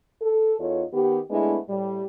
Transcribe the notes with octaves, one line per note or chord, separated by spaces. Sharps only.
A4
E2 D#4 F4 A4 C#5
D#3 B3 G4
G#3 A3 B3 D4 E4
A2 G3